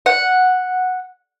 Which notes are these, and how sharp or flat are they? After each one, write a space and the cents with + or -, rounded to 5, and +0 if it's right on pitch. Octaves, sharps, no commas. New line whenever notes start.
F#5 -5